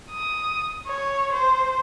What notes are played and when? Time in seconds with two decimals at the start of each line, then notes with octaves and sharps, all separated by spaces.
0.11 D#6
0.87 C#5
1.33 C5